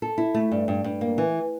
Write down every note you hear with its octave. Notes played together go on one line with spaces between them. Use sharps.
A4
E4
A3
G2
G2
G2
A#3
E3